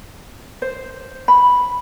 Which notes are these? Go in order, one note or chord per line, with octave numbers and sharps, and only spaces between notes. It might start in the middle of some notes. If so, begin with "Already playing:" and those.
C5
B5